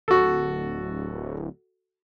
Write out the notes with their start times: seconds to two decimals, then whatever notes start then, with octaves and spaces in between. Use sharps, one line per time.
0.08 D1 F#4 A4